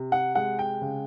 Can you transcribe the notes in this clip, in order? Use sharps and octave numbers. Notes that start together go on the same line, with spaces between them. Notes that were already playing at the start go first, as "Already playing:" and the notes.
Already playing: C3
F#5
G#3 F#5
G5
C#3